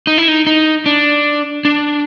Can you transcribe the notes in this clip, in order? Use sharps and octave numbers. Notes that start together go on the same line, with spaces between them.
D#4
E4
D#4
D#4
D4
D4